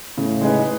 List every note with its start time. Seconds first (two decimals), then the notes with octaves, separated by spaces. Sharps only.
0.17 A2 C#3
0.41 G#3 D#4 G#4 B4